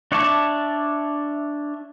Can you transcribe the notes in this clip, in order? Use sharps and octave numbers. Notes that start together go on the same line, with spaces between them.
D4 C#5 D5 E5 A5